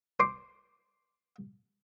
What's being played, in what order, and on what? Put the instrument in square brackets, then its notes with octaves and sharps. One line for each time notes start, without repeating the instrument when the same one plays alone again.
[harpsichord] C5 C6 D6